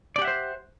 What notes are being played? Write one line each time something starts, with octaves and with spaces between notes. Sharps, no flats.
G4 C5 D5 E5 F#5